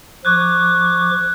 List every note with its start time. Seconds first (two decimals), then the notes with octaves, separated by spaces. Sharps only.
0.25 F3 C#6 D6 F#6 G#6